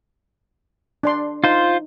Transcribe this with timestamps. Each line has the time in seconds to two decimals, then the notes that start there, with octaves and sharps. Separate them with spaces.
1.03 D4 D5 C6
1.44 D#4 F4 C5